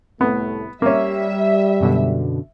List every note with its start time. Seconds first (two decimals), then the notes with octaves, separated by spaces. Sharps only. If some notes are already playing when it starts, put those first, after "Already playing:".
0.21 C2 A2 A3 B3
0.82 G3 A#3 C#4 E5
1.81 F#2 B2 D3